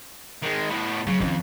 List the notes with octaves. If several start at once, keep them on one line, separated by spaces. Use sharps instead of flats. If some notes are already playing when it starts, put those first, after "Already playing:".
D#3 G#3
A2 B3
C#3 F#3
F2 D#3 C#4